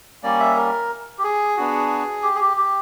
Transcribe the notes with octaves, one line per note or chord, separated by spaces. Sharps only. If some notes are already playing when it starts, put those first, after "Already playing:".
G3 A#3 C#4 D5
E5
A#4
G4
G#4
B3 D4 F#4
G4
G#4
G4
G4